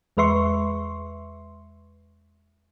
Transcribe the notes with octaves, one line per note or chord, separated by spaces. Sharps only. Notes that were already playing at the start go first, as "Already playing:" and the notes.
E2 G#3 B4 E5 C6 C#6